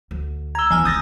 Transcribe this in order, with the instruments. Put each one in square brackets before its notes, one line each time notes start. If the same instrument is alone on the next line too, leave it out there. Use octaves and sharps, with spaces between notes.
[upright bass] D2
[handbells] A#5 E6 [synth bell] G#6 G7
[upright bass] E2 [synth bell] D#3 G#5 F6
[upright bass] C#2 D#3 [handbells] D#6 A6 A#6 [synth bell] G6